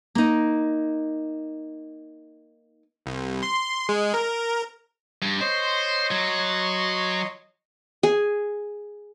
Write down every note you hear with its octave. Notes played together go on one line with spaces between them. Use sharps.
A#3 D#4
C2
C6
G#3
A#4
G2
C5 C#5 D#5 C6
F#3
G#4